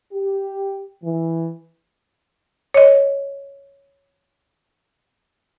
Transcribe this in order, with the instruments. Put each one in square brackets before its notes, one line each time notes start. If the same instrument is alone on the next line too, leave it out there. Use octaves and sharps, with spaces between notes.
[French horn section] G4
E3
[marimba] C#5 D#5